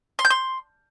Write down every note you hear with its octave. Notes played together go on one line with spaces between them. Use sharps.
C6
G6
C6